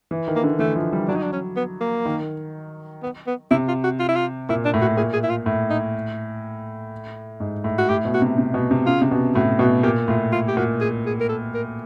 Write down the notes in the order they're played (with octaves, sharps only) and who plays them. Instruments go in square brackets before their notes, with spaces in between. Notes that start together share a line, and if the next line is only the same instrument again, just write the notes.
[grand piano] E3
D#3
[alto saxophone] A#3
[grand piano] D3
[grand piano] E3 [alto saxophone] A3
[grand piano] F3
G3
[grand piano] F#3 [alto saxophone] D4
[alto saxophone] D#4
D4
C#4
B3
A#3
[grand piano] D#3
[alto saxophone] B3
B3
[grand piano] C3 [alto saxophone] E4
[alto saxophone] F4
F#4
F4
E4
F4
[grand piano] A#2 [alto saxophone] E4
[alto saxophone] D4
[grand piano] A2
[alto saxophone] F#4
[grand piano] A#2 [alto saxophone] G#4
[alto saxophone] G#4
E4
F4
[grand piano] A2
[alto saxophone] D#4
[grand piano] G#2
A2
[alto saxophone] F#4
[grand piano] A2 [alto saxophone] G4
[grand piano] B2
[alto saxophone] F#4
[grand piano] C3
C3
B2
C3
[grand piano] C#3 [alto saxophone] F4
[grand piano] C3
B2
[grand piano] A2 [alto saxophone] F#4
[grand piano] B2 [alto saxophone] F#4
[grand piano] A#2 [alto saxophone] G4
[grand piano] A2 [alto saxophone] F4
[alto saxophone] F4
G4
[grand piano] A#2 [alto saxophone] F#4
[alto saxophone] G#4
G#4
A#4
A4
A#4